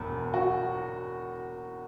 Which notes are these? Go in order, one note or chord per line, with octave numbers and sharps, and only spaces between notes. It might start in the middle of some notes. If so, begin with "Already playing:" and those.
Already playing: E1 E2
F#4